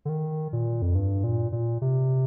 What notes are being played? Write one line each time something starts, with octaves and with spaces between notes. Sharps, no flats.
D3
D#3
A#2
F2
G2
A#2
A#2
C3